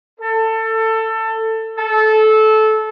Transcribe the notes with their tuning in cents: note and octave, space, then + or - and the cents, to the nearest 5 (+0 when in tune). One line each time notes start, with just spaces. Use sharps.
A4 +20
A4 -20